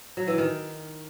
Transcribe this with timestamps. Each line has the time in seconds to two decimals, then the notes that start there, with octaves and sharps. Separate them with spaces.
0.17 F#3
0.28 E3
0.38 D#3